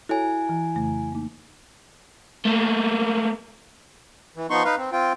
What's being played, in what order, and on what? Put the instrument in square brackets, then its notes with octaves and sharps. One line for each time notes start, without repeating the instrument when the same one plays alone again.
[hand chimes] E4 G#5 [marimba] F#4 A4 C#5
[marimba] E3
F2 C#3 A3
A#3 D#4
[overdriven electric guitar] A3 A#3
[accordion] E3
F3 B3 D#4 C6 C#6
D#4 B4 F5
C4
C4 F4 G5